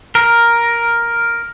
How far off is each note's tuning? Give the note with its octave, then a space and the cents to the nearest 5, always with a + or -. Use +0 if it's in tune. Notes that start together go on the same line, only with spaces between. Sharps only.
A#4 +5